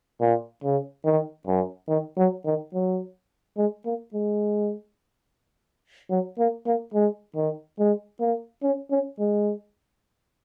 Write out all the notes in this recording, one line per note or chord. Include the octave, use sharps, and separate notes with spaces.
A#2
C#3
D#3
F#2
D#3
F#3
D#3
F#3
G#3
A#3
G#3
F#3
A#3
A#3
G#3
D#3
G#3
A#3
C#4
C#4
G#3